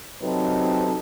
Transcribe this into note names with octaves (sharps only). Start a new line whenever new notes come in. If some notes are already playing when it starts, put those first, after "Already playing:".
C3 F#3 C4 D#4 A4 B4